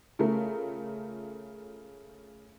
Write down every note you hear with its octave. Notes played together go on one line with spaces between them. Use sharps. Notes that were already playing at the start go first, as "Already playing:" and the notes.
C#3 A3 F4 A#4